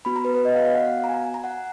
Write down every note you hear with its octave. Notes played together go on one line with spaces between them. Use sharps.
B3 F#4 B5
A#5
B4
B4
D#5
F5
F5
F#5
F5
A#5
G#5
A#5
G#5
A#5
F#5